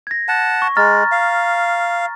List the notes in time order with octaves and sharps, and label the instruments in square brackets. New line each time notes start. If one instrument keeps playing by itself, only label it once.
[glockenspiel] G#6 A#6
[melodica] F#5 A5
[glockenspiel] C#6
[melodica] G#3 [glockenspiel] A#5 F6 A6
[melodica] F5